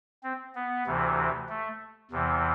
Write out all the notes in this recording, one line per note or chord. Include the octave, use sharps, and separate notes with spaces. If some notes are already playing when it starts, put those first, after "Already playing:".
C4
B3
D2 C3 E3
A3
E2 C3 E3